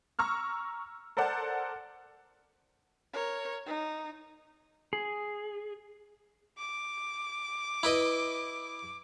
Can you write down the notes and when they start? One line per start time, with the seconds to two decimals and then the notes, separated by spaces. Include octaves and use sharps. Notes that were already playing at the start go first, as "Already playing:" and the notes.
0.19 A#5 C#6 E6 F6
1.17 A4 A#4 C5 D5 F#5 A5
3.14 A#4 C#5
3.66 D#4
4.93 G#4
6.58 D6
7.83 E4 B4 D#5